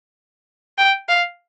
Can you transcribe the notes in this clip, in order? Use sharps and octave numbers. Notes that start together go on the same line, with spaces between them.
G5
F5